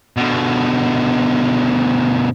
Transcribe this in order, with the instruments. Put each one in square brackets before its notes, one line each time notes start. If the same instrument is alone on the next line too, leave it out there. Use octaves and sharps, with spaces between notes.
[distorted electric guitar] B2 D3